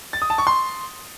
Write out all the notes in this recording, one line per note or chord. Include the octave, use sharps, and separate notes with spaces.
A6
D#6
A5
C#6
C6